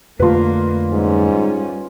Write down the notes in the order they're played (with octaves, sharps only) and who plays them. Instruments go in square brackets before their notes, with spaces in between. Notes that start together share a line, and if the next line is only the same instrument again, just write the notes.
[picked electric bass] F2 D3 A3 [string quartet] A#3 [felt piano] F4 B4
[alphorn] G#2 [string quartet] G3 C#4